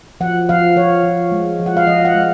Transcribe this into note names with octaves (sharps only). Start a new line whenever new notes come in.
F3 F#5
F3 F5
F3 C#5
F3
G#3
F3
F#5
F5
F3 D#5
F#5
G#3